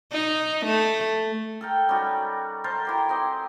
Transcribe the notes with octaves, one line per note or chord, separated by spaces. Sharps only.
D#4
A3
A4 A#4 G5
G3 C#4 D#4 F#4
A4 A#4 C5 A5
E4 G4 A#4
C4 G4 D#5 G#5